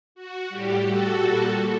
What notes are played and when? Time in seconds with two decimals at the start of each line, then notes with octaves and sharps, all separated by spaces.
0.15 F#4
0.49 A2 G3 G4
0.84 F#4 A4
1.19 A#2 G3